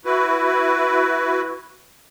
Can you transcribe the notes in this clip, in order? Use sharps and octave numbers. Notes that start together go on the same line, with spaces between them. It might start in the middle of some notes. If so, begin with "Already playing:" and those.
E4 F#4 B4